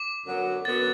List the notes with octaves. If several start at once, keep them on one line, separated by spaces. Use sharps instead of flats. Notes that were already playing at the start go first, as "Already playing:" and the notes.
Already playing: D6
F#2 D3 F#3 B3
F#2 D3 F#3 B3 A6